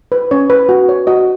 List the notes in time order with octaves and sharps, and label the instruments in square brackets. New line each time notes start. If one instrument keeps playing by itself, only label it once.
[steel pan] B4
C#4 C#5
B4
F#4
C#5
F#4 D#5